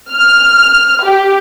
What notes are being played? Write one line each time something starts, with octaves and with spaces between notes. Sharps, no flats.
F6
G4